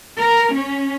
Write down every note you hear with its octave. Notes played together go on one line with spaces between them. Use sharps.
A#4
C#4